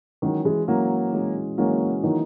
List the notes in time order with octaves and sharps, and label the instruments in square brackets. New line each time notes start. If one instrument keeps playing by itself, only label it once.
[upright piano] D#3 F#3 [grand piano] E3 G#3 C#4 F#4
[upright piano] E3 G#3
[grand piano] E3 G#3 C#4 F#4 [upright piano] F#3 A#3
[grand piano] E3 G#3 C#4 F#4
[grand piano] E3 G#3 C#4 F#4 [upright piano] F#3 A#3
[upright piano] D#3 F#3 [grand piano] E3 A#3 D#4 F#4